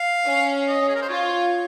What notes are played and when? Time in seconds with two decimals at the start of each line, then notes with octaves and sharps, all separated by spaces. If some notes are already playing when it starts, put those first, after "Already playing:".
Already playing: F5
0.27 C#4
0.68 D#5
0.89 G#4
0.95 A#4
1.02 C5
1.09 F4 C#5